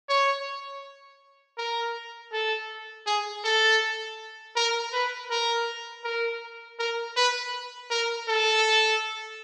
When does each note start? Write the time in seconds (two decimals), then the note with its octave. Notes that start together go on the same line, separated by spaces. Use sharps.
0.09 C#5
1.58 A#4
2.33 A4
3.06 G#4
3.44 A4
4.56 A#4
4.93 B4
5.31 A#4
6.05 A#4
6.79 A#4
7.16 B4
7.91 A#4
8.28 A4